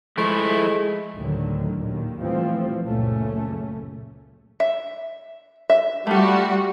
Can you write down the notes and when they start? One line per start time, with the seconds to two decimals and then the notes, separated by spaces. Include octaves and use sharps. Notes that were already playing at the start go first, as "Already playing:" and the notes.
0.18 F3 G#3 A3 E4
1.15 D2 A2 D3 D#3 F#3
1.78 D#2 A#2 D#3
2.21 E3 F3 G3 A3 C4
2.86 C#2 F#2 A#2 A3 C#4
4.60 E5
5.70 E5
6.07 G3 A3 F4 F#4